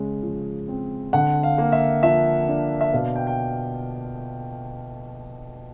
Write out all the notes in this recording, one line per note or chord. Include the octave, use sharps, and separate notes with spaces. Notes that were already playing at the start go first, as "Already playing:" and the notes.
Already playing: C#3 G#3
F3
C4
D3 F#5
F5
A#3
F5
E5
F3 E5
D4
E5
B2 F5
G5
G5